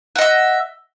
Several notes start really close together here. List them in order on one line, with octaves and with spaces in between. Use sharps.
F#5 D#5 E5